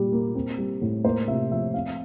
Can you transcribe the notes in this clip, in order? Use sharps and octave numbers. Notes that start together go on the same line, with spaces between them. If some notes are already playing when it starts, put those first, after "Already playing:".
Already playing: A#2 G3
A#3
C4
G3
A2
A#3 C5
C3 E5
F3 E5
C4 F5